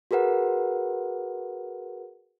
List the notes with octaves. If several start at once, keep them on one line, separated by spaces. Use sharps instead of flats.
F#4 G#4 A#4 B4 F#5